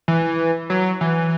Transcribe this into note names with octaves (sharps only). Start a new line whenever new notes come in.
E3
F#3
E3